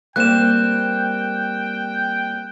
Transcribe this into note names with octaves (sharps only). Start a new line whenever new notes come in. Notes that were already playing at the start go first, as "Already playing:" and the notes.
G3 A#3 C4 G5 F#6 E7